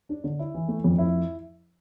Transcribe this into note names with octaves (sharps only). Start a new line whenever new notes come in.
D4
D3
E4
E3
A3
F2
E4